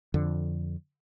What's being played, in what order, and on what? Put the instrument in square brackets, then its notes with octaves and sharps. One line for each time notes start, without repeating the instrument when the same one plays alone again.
[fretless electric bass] F2 D3